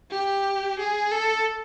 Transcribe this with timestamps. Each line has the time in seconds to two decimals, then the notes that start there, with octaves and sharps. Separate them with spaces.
0.11 G4
0.79 G#4
1.12 A4